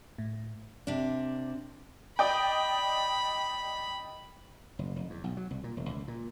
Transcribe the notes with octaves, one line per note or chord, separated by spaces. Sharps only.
A2
C3 D4
D5 D#5 G5 B5
F#1
F1
E2
B1
F#3
C2
A#2
E1
C#2
A#2